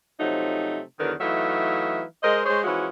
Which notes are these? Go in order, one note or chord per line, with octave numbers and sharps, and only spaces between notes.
C3 F3 F#3 A3 D#4
E2 D3 D#3 F#3 A#4 B4
E3 F#3 A3 D#4 E5 F5
G#3 A#4 C5 D#5
G#3 G#4 C5 C#5
E3 F3 G#3 C#4 F#4 E5